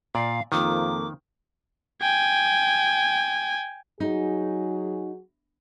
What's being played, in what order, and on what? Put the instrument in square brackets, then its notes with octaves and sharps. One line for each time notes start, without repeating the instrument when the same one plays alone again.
[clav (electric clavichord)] A#2 D5 [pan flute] F5
[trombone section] F2 F3 A#3 [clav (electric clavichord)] D#3 [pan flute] D6
[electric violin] G5 G#5
[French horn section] F#3 F#4 G#4 [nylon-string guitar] D#4